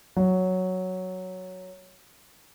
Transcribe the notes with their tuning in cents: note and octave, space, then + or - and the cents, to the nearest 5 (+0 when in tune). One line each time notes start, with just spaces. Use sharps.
F#3 +0